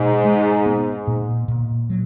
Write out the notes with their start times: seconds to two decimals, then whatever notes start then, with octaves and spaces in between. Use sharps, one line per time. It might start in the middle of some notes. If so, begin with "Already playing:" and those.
Already playing: G#2 B2
0.25 G#3
0.66 B3
1.07 A#2
1.48 A#2
1.90 F#3